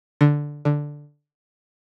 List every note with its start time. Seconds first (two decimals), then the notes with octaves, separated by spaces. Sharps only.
0.21 D3
0.65 D3